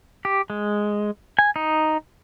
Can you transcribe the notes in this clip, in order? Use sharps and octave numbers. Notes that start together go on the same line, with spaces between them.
G4
G#3
G#5
D#4